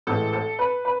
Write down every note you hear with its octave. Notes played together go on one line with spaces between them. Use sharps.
A1 A2 E3 G#3 A4
A4
B4
B4